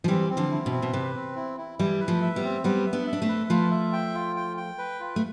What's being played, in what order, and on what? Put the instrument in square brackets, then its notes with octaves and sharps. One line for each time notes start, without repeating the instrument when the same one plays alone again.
[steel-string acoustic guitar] F3
[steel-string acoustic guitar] E3 G3 [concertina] C4
[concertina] C4
[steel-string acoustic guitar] D3 F3
[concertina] E4
[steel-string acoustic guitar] B2
[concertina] C4
[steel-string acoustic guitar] B2
[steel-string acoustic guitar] C3 [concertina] B4
[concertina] C4
E4
E4
[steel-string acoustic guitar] E3 G3 [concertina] E4
[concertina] B4
[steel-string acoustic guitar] F3 A3
[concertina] E5
[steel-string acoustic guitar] G3 B3
[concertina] C4
[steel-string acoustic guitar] G3 B3 [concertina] B4
[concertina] E5
[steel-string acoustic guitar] B3 D4
[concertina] E5
[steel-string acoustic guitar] D4
A3 C4
[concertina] B4
[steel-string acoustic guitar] F3 A3 [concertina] F4
[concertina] E5
G5
F4
G5
G5
B4
F4
[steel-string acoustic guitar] A3